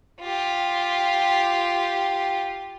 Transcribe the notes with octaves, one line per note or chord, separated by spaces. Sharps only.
F4 G4